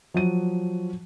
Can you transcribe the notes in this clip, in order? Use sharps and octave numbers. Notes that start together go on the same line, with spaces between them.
F3 F#3 D#7